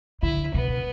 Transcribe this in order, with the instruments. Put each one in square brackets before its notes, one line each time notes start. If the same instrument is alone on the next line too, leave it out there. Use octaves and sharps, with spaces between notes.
[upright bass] D3 [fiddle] E4
[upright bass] B2 [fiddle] B3